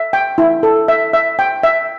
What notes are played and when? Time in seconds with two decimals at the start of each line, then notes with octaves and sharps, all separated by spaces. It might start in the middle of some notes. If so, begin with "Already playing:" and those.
Already playing: E5
0.13 G5
0.38 E4
0.63 A4
0.88 E5
1.13 E5
1.39 G5
1.63 E5